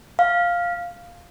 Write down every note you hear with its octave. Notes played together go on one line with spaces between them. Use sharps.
F5